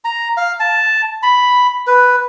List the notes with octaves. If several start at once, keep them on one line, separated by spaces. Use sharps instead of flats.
A#5
F5
A5
B5
B4